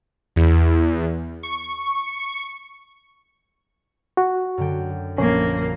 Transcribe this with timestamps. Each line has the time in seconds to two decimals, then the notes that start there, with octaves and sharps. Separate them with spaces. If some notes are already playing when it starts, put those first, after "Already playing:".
0.36 E2
1.43 C#6
4.17 F#4
4.58 F#2 D3 G5
5.18 A#1 A#3 C#4 C5 G#6